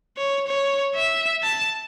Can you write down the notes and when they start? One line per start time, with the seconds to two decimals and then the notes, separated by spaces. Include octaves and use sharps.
0.17 C#5
0.48 C#5
0.96 E5
1.43 A5